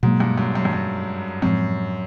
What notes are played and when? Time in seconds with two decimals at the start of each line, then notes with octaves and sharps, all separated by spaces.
0.03 G#2 B2 F#3 A#3
0.20 G2
0.38 F#2
0.55 F#2
0.65 G2
0.73 F#2
1.42 F#2 A2 F3 G#3 C4